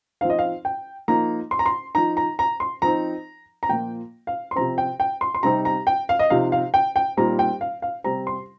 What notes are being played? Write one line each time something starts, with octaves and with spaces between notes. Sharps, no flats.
F3 C4 D#4 F5
D#5
F5
G5
F3 A#3 D#4 A#5
C6
A#5
C6
F3 D#4 A#5
A#5
A#5
C6
F3 C4 D#4 A#5
A#5
A#2 F3 A#3 G5
F5
C6
C3 F3 C4 A#5
G5
G5
C6
C6
C3 G3 C4 D#4 A#5
A#5
G5
F5
D#5
C3 F3 D#4 F5
F5
G5
G5
A#2 G3 C4 D#4 A#5
G5
F5
F5
C3 G3 C4 A#5
C6